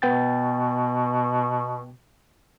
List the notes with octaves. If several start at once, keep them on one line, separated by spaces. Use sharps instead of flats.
B2 B3 G5 A6